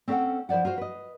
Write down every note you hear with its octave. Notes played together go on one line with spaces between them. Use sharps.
C4 C#4 A4 C#5 F#5 G5
F3 E4 C5 D5 F#5
F4 F#4 C5
B4 D#5